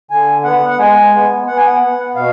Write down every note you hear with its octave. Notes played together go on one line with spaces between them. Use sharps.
D3 G#5
B3 F#5
F#5
G#3 G#5
B3
B3 F#5
G#5
F#5
B3
B2 F5